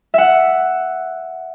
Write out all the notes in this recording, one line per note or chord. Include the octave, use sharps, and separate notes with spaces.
E5 F#5